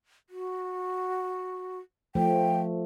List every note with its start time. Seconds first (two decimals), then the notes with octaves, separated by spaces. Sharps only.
0.30 F#4
2.15 F3 A3 G5